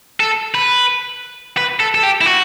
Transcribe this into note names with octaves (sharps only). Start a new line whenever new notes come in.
A4
B4
B4
A4
A4
G4
E4
F#4